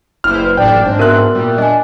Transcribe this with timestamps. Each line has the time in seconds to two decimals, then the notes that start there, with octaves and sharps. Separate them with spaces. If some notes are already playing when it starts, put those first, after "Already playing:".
0.24 F#1 E4 B4 C5 F6
0.57 A1 D4 D5 G5
0.85 G#2 C4 D4
0.99 B2 A#4 E5 C6 F#6
1.35 A#2 G3
1.58 D4 D#5 G#5